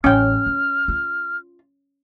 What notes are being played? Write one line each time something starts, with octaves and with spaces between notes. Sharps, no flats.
A1 C#4 G5 F6
F4
F4